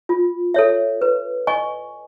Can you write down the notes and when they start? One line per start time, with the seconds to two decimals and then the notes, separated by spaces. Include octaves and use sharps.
0.09 F4
0.54 A4 C#5 E5
1.01 B4
1.47 D#5 G#5 C#6